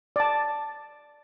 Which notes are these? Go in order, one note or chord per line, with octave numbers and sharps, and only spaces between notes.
D5 A5